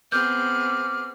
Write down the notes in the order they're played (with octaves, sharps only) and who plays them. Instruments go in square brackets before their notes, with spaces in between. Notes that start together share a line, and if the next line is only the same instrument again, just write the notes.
[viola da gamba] B3 C4 G#4 [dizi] D6 [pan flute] F6 [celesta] G6